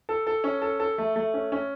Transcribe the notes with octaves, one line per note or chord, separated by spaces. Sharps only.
A4
A4
C#4
A4
A4
A3
A3
C#4
C#4